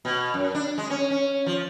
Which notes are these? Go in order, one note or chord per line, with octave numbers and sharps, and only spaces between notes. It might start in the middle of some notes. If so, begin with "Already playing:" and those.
B2
F#2
D4
G#3
C#4
C#4
F3